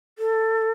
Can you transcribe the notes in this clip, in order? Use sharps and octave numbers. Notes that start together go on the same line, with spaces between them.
A4